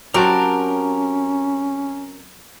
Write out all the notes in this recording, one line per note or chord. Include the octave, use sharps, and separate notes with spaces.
F#3 C4 C#4 F#4 G4 A#4 G5 A5